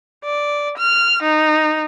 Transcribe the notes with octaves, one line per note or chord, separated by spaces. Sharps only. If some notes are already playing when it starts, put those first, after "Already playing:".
D5
F6
D#4